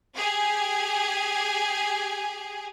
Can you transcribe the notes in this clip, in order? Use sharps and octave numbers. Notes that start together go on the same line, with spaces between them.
G4 G#4 G#5